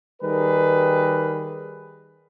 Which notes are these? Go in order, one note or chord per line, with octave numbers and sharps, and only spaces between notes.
D#3 G3 G#4 A#4 B4